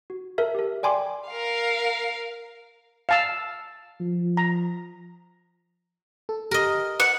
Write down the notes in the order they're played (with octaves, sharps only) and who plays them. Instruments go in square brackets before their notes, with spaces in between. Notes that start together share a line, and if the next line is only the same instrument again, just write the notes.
[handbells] F#4
A4 A#4 E5
G4 A4
D5 G5 G#5 B5 C6 D6
[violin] A#4 F5
[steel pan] F5 A5 E6
[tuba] F3
[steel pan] A#5
[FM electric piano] A4
[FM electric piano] G4 [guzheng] A#4 D#5
[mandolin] F#5